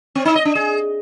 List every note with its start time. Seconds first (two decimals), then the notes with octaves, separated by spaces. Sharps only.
0.15 C4
0.25 D#4
0.35 D#5
0.45 D4
0.55 G#4